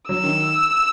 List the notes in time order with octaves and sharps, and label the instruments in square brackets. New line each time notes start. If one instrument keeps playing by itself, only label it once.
[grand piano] F#3 [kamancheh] E6
[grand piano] D#3